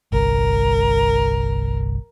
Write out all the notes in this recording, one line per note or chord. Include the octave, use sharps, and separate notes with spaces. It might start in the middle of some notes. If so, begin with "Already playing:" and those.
G1 C2 A#4